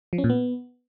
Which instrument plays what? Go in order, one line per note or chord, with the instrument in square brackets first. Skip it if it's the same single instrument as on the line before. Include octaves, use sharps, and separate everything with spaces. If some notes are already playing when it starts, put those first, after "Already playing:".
[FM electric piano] F3
C#4
A#2
B3